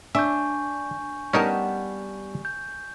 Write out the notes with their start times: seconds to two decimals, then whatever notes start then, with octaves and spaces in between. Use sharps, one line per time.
0.15 D4 E5 G#5 C#6 G6
1.33 G3 B3 C#4 D#4 A#4 A5
2.45 G6